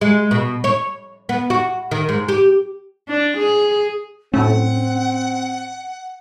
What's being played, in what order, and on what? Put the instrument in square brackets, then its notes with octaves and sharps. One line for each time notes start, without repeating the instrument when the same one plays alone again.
[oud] G#3
B2
C#5
B3
F#4
D#3
G#2
G4
[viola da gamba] D4
G#4
[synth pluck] A2 F#3 A3 [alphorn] C4 [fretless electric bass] C#4 [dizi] F#5